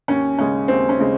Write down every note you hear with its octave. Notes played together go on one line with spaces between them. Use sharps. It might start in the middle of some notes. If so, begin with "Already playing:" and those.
D#2 C#4
C#3 G#3 C#4
D#2 C4
C#4
C#3 G#3